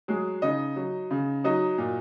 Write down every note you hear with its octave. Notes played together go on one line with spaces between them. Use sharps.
F#3 G#3 G#4
C#3 D#4 D#5
F#3
C#3
F#3 D#4 D#5
A#2